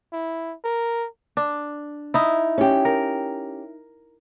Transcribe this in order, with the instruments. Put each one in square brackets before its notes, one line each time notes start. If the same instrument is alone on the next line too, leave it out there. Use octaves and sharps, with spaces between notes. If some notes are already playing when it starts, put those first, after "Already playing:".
[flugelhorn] E4
A#4
[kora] D4
D#4 E4
[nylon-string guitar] C#4 G4
[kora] A#4